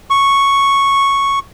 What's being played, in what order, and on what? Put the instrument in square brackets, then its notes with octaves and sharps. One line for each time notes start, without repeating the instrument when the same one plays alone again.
[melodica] C#6